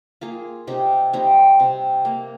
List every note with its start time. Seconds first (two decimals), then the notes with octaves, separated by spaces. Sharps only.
0.21 A#3 F4 G#4
0.67 C3 D#4 G4
1.13 G3 C4 D#4
1.60 C3
2.05 A#3